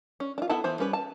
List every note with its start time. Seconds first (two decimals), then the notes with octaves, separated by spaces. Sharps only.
0.20 C#4
0.38 D4 F4
0.49 B3 E4 A4 F#5 A5
0.64 E3 B3 C5
0.79 G3 C#4 B4
0.93 A5